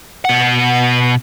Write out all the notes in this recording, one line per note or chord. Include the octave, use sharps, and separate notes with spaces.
B2 F#5